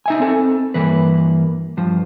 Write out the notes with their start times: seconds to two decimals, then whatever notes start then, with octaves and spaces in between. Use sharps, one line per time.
0.06 D#4 E5 G#5
0.20 C4 A4
0.74 G2 E3 A#3 B4
1.77 G2 F3